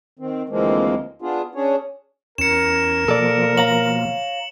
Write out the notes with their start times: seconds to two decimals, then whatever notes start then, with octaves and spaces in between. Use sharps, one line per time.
0.19 D#3 C4
0.49 D2 E3 F3 G#3 A#3 C4
1.22 B3 D4 F4 G#4
1.55 C#4 D4 G#4 C#5
2.38 E2 C#4 A#4 C#7 E7
3.08 B2 F3 A#3 A4 D5
3.57 C#5 F5 A#5 F#7